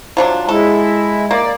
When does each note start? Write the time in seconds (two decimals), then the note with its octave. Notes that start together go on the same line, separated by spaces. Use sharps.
0.17 F3 F#3 D4
0.49 G#3 E4 A4
1.31 A#3 D5